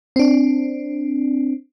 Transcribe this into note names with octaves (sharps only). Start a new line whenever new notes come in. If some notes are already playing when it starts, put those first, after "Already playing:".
C4 D4